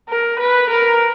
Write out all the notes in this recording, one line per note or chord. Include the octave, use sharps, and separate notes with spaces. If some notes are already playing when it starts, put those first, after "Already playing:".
A#4
B4
A#4